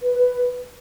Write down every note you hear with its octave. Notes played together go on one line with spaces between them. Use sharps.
B4
B4